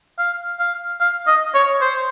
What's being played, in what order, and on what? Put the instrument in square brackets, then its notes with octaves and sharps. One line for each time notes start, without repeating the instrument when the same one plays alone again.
[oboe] F5
F5
F5
D#5
C#5
C5